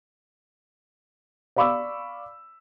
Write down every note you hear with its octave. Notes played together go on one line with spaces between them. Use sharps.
D5 F5 B5 C#6 D6 E6